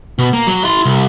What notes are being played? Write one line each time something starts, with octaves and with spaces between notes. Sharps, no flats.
B2
A#3
F#3
E4 C6
C2